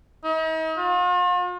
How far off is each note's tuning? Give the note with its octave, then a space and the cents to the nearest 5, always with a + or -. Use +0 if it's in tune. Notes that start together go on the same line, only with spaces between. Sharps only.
D#4 +45
F4 +45